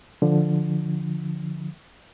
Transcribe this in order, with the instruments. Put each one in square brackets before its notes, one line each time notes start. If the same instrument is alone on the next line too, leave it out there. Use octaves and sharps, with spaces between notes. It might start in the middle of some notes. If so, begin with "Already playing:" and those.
[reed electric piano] D3 F3